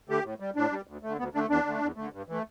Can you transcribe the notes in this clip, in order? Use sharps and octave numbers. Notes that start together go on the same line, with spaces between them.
D3 A3 G4
A2
G3
A2 D4
G3
D2
D3 A3
D2 B3
D3 A3 D4
E2 D4
D3 A3
E2
D3 A3
G2
E3 A3